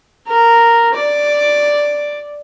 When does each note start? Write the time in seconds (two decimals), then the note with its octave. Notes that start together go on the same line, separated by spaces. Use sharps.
0.27 A#4
0.94 D5